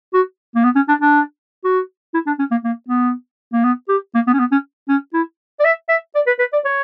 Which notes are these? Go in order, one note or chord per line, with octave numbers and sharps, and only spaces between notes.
F#4
A#3
B3
C#4
D4
D4
F#4
E4
D4
C#4
A#3
A#3
B3
A#3
B3
G4
A#3
B3
C#4
B3
C#4
C#4
E4
D5
E5
E5
D5
B4
B4
D5
C#5